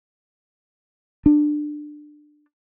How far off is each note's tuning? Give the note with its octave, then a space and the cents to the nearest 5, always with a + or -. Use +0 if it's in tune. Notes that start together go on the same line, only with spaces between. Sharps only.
D4 +20